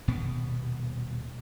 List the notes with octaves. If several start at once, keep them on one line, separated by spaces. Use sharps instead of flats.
D#1 B2 B3